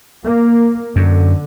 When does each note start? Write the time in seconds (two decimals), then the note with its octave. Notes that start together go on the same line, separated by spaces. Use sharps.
0.25 A#3
0.96 F#2 D3